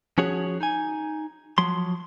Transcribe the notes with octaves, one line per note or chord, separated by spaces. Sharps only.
F3 C#4 F#4 G#4 C#5
D#4 G#5
F3 F#3 C6